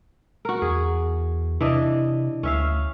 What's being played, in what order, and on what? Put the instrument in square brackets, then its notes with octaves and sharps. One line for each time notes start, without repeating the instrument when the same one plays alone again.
[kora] F#4 A#4
[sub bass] E2 [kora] G#4
[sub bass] C3 [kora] E3 D4 D#5
[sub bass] D2 [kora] C#4 E5 F5